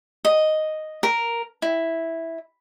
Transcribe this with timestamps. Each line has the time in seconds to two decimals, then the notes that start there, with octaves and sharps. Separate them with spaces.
0.25 D#5
1.03 A#4
1.62 E4